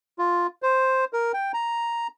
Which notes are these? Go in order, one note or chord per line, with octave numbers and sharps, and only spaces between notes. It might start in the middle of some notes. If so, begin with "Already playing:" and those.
F4
C5
A#4
G5
A#5